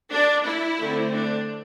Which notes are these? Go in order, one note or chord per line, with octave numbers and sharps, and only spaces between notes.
D4
E4
D3 A3 C4
D4